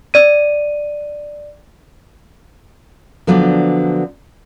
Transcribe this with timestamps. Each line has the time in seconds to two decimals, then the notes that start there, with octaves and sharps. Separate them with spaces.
0.14 D5 D#7
3.27 D3 F3 F#3 B3 D4